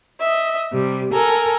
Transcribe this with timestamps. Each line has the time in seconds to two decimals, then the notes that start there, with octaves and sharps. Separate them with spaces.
0.20 D#5 E5
0.73 C3 G3
1.13 A4 A#4 G#5 A#5